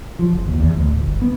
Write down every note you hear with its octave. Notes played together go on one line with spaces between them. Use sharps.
F3
F#1
D#2
E2
D2
D1
G1
B3